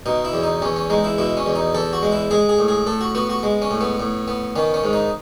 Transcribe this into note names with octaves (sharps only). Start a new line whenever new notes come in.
B2 D#4
E4
E2
D#4
E2 C#4
C#4
G#3 D#4
E4
B2 E4
C#4
E2
D#4
E2 A4
F#4
G#3
E4
G#3 G#4
G#4
A2
G#4
A2 A4
F#4
B3 F#4
F#4
G#3
C#4
A2
B3
A2
B3
D#3 C#4
C#4
G#2
D#4